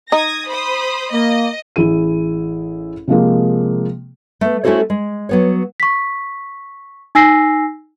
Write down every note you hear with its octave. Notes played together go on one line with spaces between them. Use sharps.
D#4 D#6 G#6 A#6
C5 B5 D#6
A#3 D#5
A1 E4 G#4 D#7
C3 F3 G#3 A#3
A3 B3
A3 C#4 E4 F#4 A4 C5
G#3
F#3 B3 C#5
C#6 B6
D#4 G#5 E6 A#6 C7